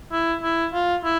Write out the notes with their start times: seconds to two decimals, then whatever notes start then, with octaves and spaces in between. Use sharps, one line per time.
0.12 E4
0.43 E4
0.74 F4
1.04 E4